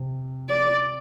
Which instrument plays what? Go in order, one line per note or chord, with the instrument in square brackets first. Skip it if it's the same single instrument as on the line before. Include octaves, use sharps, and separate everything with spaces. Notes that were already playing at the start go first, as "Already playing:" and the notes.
Already playing: [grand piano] C3
[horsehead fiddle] D5